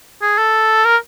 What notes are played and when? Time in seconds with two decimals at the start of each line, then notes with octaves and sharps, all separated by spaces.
0.22 G#4
0.38 A4
0.85 A#4